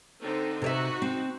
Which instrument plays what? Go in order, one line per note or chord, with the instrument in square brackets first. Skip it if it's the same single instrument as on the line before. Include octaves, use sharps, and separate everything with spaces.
[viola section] D3 C4 D#4
[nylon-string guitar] C3 C#5 E5 [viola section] D#4 F#4
[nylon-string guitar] C4